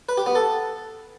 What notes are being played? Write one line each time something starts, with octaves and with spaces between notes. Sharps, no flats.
B4
G4
B3
A4